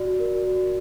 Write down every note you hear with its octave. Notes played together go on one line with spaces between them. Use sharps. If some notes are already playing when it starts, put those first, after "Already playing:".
Already playing: F#4 D5
A#4
F#4